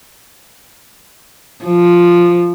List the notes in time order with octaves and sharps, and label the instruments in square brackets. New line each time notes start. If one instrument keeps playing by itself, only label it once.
[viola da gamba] F3